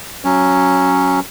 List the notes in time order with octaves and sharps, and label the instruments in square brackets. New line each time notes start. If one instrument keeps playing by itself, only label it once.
[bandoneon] F#3 C#4